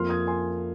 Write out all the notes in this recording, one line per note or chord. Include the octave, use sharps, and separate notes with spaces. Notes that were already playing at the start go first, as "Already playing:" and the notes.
Already playing: F2 F3 A#3 C6 F6
D#6 G#6
G#5 C6